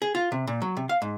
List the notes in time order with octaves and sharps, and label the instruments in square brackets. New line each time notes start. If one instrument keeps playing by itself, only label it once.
[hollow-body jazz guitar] G#4
F4
C3
A#2
F#3
C3
F5
G#2